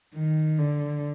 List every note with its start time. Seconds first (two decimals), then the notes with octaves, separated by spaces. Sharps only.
0.15 D#3
0.58 D3